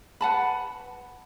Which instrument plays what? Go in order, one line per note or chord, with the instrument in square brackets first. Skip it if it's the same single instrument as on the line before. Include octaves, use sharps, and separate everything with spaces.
[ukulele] B4 F#5 A5 B5